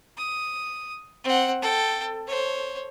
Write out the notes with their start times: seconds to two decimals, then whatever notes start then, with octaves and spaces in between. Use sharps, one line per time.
0.17 D#6
1.24 C4 F#5
1.62 A4 G5
2.27 C5 C#5